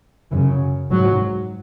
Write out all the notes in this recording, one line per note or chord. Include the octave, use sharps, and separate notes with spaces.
F#2 C#3 E3
G#2 F#3